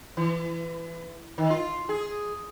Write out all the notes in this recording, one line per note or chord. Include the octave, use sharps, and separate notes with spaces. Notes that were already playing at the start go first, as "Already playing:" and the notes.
E3
D#3
F4
G#4